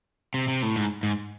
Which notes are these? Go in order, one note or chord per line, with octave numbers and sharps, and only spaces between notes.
C3
C3
A2
G#2
G#2